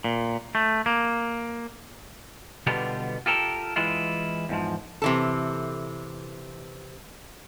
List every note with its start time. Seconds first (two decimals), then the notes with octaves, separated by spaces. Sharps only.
0.04 A#2
0.55 A3
0.86 A#3
2.67 B2 D3 G3 B3 F4 G4
3.26 F4 G4 A4 A#4
3.76 E3 G#3 E4 F4
4.49 E2 G#2 F3
5.02 C3 E3 A4